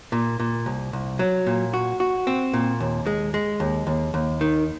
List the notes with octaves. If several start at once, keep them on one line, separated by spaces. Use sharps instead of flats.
A#2
A#2
C2
C2
F#3
A#2
F#4
F#4
C4
A#2
D#2
G#3
G#3
D#2
D#2
D#2
D#3